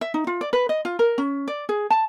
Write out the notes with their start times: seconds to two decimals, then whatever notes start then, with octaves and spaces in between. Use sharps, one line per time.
0.01 E5
0.14 D#4
0.27 F4
0.41 D5
0.53 B4
0.69 D#5
0.85 F4
0.99 A#4
1.18 C#4
1.48 D5
1.69 G#4
1.91 A5